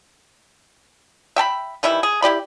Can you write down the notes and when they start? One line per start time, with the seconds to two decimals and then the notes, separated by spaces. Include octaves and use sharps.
1.36 E5 G5 A5 B5
1.83 D#3 E3 G3 E4
2.03 G#4
2.22 E4 G4 D5 B5